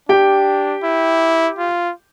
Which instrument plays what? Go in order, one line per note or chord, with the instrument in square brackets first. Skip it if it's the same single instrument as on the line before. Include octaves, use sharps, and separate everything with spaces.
[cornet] D4 [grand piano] G4 G5
[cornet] E4
F4